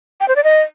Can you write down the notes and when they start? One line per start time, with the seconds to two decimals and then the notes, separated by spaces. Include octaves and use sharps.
0.20 G5
0.28 C5
0.36 D5
0.44 D#5